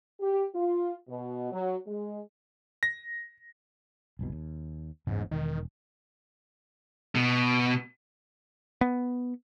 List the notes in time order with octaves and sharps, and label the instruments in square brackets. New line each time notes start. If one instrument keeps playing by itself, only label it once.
[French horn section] G4
F4
B2
F#3
G#3
[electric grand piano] A#6
[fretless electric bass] F#1 C2 B2
D#2
[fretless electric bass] F#1 E2 C#3 [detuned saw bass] G#2
[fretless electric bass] E1 [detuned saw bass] D#3
[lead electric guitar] B2
[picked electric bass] B3